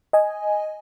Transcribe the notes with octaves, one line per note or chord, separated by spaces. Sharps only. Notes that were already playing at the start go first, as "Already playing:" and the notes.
D#5 G#5